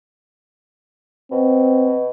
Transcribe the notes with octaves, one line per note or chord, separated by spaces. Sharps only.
B2 C4